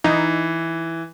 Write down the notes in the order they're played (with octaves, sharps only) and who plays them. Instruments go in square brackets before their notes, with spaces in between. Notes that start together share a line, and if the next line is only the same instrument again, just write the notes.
[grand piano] E3 [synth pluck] D#4